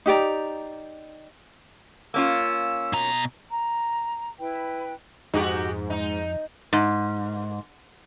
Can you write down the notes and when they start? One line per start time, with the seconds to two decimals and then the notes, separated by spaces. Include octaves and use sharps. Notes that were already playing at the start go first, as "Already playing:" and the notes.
0.06 D#4 G4 D5 A#5
2.14 A#3 C#4 F4 E6
2.93 B2 A#5
3.51 A#5
4.39 E4 B4 G5
5.34 F2 G#2 D#4 F#4 G4
5.90 D#4
6.73 G#2